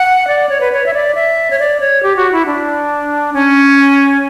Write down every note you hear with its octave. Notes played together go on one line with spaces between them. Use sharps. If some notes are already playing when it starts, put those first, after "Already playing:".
Already playing: F#5
D5
C#5
B4
C#5
E5
D5
E5
C#5
D5
C#5
G4
F#4
E4
D4
C#4